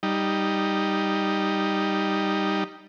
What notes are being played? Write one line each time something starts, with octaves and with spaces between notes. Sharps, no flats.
G3 D#4